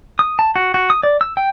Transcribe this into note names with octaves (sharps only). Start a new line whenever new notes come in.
D#6
A5
F#4
F#4
D#6
D5
E6
G5